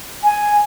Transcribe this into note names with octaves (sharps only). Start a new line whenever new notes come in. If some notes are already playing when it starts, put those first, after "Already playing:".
G#5